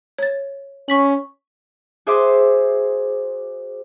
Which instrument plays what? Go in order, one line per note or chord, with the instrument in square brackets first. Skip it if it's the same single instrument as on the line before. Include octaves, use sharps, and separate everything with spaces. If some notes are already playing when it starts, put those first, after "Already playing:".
[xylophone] C#5 A6
[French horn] C#4 [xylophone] C#6 B6 F#7
[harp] F#4 G#4 C5 E5 C6 D6